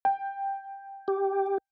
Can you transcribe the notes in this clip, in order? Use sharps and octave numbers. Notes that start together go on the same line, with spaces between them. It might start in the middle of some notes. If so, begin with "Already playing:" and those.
G5
G4